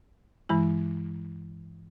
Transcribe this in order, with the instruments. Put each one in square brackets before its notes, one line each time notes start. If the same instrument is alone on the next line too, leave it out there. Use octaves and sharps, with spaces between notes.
[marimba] G2 E3 G#3 E4